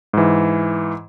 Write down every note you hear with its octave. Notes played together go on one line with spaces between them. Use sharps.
G#2 E3